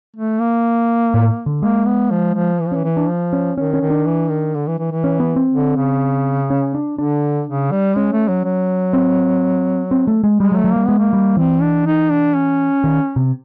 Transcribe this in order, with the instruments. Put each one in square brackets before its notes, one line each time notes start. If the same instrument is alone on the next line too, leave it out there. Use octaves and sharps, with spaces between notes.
[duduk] A3
A#3
[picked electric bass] A2
D3
[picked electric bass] G#3 [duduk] A#3
[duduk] B3
F3
F3
E3
F3
[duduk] E3 [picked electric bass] C#4
[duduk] E3
[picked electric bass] D4
[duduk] F3
[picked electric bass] C#4
[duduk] D#3 [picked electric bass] C#4
[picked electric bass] C#4
[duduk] D#3
[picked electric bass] D4
[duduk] E3
D#3
D3
E3
E3
E3
[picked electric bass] C#4
B3
C4
[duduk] D3
C#3
[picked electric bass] C#4
D4
[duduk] D3 [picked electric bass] D4
[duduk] C#3
G3
[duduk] G#3 [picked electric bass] C#4
[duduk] A3
F#3
F#3
[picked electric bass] C4
C4
A3
G#3
[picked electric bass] G3 [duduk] G#3
[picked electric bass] F#3
[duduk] A3
[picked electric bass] F#3
[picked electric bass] G3 [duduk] A#3
[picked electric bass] G#3 [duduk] B3
[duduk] A#3
[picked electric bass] G3
[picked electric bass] E3 [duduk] C4
[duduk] D4
D#4
D4
C#4
[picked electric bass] D#3
C3